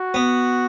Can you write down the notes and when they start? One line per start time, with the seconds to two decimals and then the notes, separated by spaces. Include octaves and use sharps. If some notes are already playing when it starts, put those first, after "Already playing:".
Already playing: F#4
0.14 B3